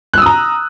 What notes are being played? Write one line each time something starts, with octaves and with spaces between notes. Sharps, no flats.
A#5 D#6 E6 F#6